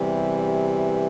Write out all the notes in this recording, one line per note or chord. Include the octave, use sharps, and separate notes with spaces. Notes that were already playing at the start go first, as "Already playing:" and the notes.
Already playing: E2 C3 E3 G3